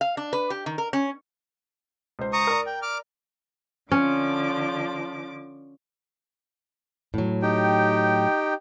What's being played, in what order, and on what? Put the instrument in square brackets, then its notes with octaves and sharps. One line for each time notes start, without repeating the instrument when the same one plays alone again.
[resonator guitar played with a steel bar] F5
D4
B4
G4
D#3
A#4
C#4
[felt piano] C#2 C5
[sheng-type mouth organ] A#5 C#6 D#6
[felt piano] A#4 D5
[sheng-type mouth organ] G5
D6 F6
[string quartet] D3 F3 D6 [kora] C#4
[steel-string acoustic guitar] A2 F#3
[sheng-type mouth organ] D#4 G4 G5